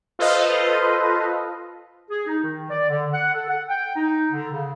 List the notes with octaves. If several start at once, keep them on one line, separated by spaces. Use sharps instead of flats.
F4 A4 B4 C5 D#5 F5
G#4
D#4
D#3
D5
D3
F#5
A4
F#5
G5
D#4
D3
C#3